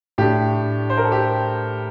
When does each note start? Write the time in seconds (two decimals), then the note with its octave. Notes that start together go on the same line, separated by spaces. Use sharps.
0.18 A2 A3 D4 G4
0.90 C5
0.97 A#4
1.05 A4
1.12 G4